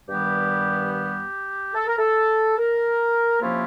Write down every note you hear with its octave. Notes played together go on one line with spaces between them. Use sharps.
G2 D#3 G3 B3 G4
G4
A4
A#4
A4
A#4
C3 F3 A#3 C#4 E4 F4